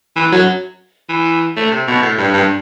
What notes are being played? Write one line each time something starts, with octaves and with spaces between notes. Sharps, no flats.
E3
F#3
E3
A3
C3
B2
A2
G2
G2